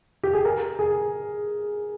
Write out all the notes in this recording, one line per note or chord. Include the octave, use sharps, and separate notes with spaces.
G4
G#4
A#4
G#4